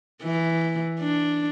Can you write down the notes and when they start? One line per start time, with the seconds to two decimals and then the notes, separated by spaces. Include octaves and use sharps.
0.24 E3
1.00 D4